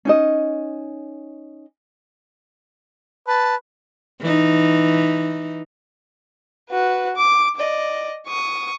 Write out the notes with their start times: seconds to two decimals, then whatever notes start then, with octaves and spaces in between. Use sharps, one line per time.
0.05 C#4 D#4 D#5
3.27 B4 A5
4.21 E3 D#4
6.70 F#4 B4
7.16 D6
7.56 D5 D#5
8.28 C#6 D#6